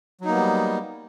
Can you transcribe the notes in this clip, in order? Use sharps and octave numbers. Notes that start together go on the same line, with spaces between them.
F#3 G3 A#3 B3 D#4